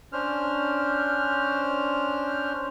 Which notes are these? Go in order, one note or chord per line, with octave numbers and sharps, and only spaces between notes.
C#4 D4 C5 F6